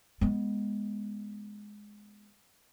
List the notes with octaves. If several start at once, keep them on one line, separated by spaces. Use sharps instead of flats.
G#3 B3